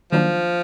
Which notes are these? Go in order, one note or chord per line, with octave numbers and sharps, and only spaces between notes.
D#3 F3 F#3 A#3 D4